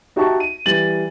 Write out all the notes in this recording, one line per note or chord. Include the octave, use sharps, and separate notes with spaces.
D#4 F#4 G4 E5 A5 C#6
D#7
E3 G3 E4 A6 F#7